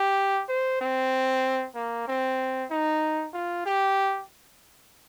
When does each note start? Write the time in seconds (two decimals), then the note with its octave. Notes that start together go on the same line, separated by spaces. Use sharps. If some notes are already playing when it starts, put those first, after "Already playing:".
Already playing: G4
0.49 C5
0.81 C4
1.75 A#3
2.08 C4
2.71 D#4
3.34 F4
3.66 G4